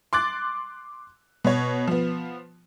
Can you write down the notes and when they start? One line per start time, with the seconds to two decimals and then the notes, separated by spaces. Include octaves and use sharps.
0.13 C6 D6 F#6 A6
1.44 B2 C#5
1.88 F3 B3